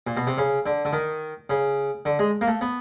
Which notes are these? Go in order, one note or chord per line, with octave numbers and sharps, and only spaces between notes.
A#2
B2
C3
C#3
D3
D3
D#3
C#3
D3
G#3
A#3
A3
B3